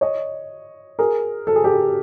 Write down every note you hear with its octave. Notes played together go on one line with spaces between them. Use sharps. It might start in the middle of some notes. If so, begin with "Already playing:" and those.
C#5 D#5
G#4 A#4
A4
G#4
G4 A4